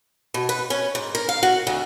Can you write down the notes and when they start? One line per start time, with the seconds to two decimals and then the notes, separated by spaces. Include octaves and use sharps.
0.34 B2
0.49 B4
0.70 C#4
0.95 G#2
1.15 A#4
1.29 F5
1.43 F#4
1.67 D2